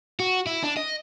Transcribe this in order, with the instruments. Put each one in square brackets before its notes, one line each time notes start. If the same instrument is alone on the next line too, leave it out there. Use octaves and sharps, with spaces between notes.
[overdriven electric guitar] F#4
E4
D4
D#5